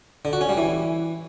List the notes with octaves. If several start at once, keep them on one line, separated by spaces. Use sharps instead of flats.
D3
F#4
C#4
G3
E3